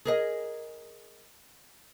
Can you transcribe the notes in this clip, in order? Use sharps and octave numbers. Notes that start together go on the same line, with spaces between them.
G#4 A#4 D#5